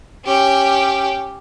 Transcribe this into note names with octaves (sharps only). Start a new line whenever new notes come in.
C#4 G4